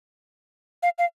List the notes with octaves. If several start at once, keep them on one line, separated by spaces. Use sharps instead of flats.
F5
F5